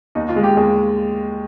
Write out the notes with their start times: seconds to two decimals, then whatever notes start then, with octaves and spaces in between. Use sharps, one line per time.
0.15 D#2 D#4
0.29 F4
0.36 G#3
0.43 G4
0.57 D#2 G#4